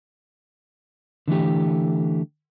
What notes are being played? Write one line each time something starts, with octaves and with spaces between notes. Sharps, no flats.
D3 E3 A3 G4